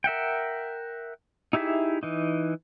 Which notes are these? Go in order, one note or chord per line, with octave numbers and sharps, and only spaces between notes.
A#4 E5 F#5 G5
D#4 E4 G4 G#4 E5
E3 D#4